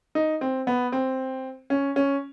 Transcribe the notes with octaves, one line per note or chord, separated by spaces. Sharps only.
D#4
C4
B3
C4
C#4
C#4